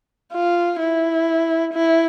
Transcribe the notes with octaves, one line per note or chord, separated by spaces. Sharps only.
F4
E4
E4